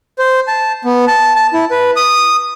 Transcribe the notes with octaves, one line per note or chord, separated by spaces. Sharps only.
C5
A5
B3
A5
A5
E4
B4
D#6